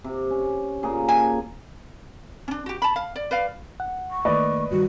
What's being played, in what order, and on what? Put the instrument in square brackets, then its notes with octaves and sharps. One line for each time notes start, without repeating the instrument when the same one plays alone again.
[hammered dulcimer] C3
C#4
A#2 G#4 A#5
[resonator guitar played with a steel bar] G#5
[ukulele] C#4 D4
F#4 G4
A5 B5
F5
D5
B4 D5 F5
[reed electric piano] F#5
[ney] C#6
[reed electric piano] D#3 A3 A#3 [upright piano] B4 D5 D#5
[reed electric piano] G2 D#3 G3 [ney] F#4